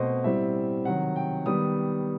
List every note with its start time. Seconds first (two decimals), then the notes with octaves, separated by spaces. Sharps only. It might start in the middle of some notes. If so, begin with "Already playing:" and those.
Already playing: B2 A3 C4 C5 D#5
0.24 A2 G3 C4 E5
0.85 C3 D#3 F#3 F#5
1.16 G5
1.46 D#3 G3 B3 D#6